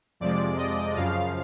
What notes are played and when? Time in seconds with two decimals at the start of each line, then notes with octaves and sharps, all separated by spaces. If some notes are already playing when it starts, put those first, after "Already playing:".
0.20 F2 C3 F3 G#3 D5
0.58 D#5
0.97 F#2 C#3 F3 F5